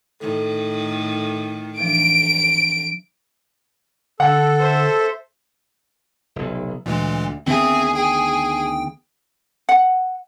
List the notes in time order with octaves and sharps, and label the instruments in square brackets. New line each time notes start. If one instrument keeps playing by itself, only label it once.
[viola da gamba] A2 D#3 [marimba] A4
[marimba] E3 F3 D4 [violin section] D7
[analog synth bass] D3 [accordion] A4 [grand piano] F#5
[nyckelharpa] C5 E5
[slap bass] F1 B1
[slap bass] D2 [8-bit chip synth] A#2 E3 G#3
[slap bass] D2 D#3 B3 [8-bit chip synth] C4 E5 [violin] G#4
[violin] G#4 [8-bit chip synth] G5
[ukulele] F#5